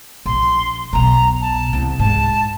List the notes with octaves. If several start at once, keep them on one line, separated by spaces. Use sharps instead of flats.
A#1 C6
B1 B2 A#5
A5
C2 C#3
G#2 A5